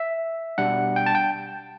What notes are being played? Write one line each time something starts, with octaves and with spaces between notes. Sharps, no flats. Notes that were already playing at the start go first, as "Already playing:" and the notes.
Already playing: E5
B2 G3 D4 F#5
G5
A5
G5